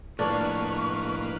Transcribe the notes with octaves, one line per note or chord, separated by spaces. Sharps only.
A2 F3 A#3 D4 B4 C#6 F6